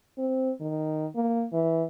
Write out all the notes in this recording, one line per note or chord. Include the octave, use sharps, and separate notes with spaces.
C4
D#3
A#3
E3